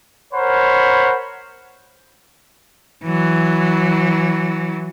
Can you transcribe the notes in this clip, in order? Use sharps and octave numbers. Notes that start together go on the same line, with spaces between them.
A#4 C5 C#5 F#5 B5
E3 F#3